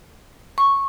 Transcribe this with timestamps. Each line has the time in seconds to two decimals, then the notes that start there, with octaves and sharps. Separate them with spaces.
0.58 C#6